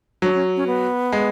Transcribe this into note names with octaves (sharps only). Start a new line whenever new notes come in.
F#3 D4
C#4
C#4
B3
G#3